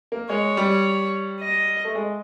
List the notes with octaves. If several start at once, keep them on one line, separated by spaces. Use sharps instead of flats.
A#3
G#3 C#5
G3
D#5
A3
G#3